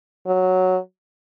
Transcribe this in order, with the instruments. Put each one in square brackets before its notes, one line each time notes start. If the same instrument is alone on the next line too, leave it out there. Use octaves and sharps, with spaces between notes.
[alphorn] F#3